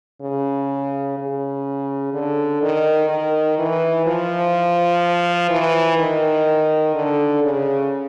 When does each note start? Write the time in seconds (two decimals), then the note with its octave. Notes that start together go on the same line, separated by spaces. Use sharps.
0.22 C#3
1.18 C#3
2.13 D3
2.62 D#3
3.10 D#3
3.58 E3
4.06 F3
5.50 E3
5.98 D#3
6.95 D3
7.42 C#3